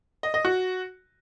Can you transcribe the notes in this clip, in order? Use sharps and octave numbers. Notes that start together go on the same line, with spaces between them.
D#5
D#5
F#4